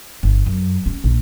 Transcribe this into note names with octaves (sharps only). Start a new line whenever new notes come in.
G1
F#2
C#4
A#1